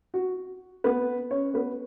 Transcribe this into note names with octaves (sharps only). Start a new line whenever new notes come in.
F#4
B3 B4
C#4 C#5
B3 B4